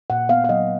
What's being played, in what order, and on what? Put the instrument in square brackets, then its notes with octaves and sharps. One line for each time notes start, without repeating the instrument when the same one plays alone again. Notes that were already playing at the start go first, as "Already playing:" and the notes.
[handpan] A#2 F#5
B3 F5
F5
F#3 D#5